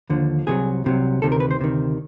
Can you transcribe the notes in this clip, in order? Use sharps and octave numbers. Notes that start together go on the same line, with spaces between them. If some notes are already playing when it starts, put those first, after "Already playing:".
D#2 D3 F3
C2 C3 D#3 F#3 G#4
C2 C3 D#3 F#3
D2 C3 D#3 A4
A#4
B4
C5
D2 C3 D#3